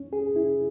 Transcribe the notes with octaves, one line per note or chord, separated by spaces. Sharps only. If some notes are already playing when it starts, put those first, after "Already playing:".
Already playing: C#4
G#4
E4